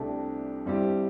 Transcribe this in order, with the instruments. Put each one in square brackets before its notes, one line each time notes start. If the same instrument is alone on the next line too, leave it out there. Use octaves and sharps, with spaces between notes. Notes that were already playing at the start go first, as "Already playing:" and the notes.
Already playing: [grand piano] C2 C3 A3 D4 G4
G2 G3 C4 E4 G4